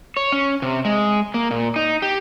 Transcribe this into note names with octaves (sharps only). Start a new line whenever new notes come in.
C#5
C#4
C3
G#3
A#3
A#2
D#4
G4